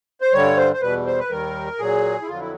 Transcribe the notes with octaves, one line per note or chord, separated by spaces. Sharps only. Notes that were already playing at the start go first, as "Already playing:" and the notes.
C5
G2 D3 G3 C#5
C5
C5
E2 B2 G3 B4
C5
B4
D#2 D#3 G3 A#4
A#2 F#3 G#4
E4
F2 D3 F#3 F4
E4